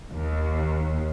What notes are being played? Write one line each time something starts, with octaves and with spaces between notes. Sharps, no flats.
D#2